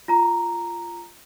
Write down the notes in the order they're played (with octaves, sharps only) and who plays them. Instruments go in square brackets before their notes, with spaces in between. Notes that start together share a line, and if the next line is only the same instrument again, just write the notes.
[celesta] F4 A#5